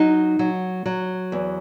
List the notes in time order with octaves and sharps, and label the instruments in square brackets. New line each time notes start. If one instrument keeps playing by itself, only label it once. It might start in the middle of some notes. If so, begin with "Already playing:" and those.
Already playing: [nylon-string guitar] F#3 D#4
F#3
F#3
E2